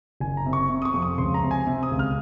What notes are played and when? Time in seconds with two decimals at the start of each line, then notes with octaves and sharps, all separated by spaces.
0.20 F#1 G#5
0.37 A#5
0.46 C3
0.53 C#6
0.69 C3
0.82 D#6
0.85 C#6
0.94 F2
1.02 D#6
1.18 C#2 C6
1.34 A#5
1.43 C3
1.51 G#5
1.67 C3
1.83 D#6
1.91 C#2
1.99 F6